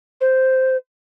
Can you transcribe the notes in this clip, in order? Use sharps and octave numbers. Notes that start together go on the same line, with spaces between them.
C5